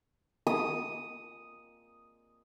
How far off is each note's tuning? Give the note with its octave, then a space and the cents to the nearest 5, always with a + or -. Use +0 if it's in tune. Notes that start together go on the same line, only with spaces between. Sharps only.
D#6 +0